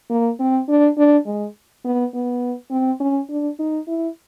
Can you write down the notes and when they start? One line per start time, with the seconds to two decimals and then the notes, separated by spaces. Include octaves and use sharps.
0.10 A#3
0.40 C4
0.68 D4
0.97 D4
1.26 G#3
1.85 B3
2.14 B3
2.71 C4
3.00 C#4
3.29 D4
3.59 D#4
3.88 E4